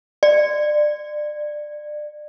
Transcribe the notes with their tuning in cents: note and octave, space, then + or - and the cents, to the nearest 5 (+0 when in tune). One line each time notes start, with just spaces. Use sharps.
D5 +25